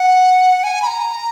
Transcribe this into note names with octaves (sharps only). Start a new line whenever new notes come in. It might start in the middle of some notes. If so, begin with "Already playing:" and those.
Already playing: F#5
G#5
B5
A#5